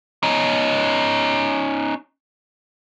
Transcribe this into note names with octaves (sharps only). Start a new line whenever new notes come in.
C#4 D#4